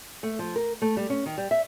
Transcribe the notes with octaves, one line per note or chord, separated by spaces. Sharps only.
A3
F3
A#4
A3
G3
C#4
D#3
G3
E5